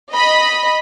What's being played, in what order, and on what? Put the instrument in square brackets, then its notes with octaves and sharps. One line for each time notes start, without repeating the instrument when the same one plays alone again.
[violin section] D#5 B5